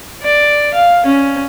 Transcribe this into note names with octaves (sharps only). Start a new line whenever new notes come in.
D5
F5
C#4